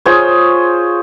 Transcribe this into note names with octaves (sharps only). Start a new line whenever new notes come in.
F4 G#4 C5 C#5